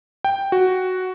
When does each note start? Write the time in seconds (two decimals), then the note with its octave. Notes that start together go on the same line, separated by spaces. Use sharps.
0.24 G5
0.52 F#4